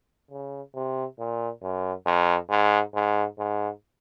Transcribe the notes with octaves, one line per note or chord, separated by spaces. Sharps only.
C#3
C3
A#2
F#2
F2
G#2
G#2
G#2